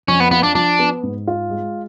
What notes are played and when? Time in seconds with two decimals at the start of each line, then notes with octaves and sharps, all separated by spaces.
0.08 F2 C#4
0.20 B3
0.31 B3 F4
0.43 D4
0.55 F3 D4
0.79 B3
1.03 G#2
1.27 F4
1.50 G#3